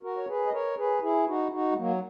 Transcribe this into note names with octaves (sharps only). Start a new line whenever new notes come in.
F#4 A#4
C#5
G#4 B4
D#5
A#4 C#5
G#4 B4
E4 G#4
D#4 F#4
D#4 F#4
G#3
F#3 A#3